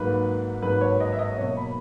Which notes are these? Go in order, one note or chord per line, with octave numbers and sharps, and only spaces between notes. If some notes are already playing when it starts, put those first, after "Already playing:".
Already playing: G#2 F#3 A#3 B4
G#2 F#3 A#3 B4
C#5
D#5
E5
D#5
B2 F#3 A#3 C#5
B5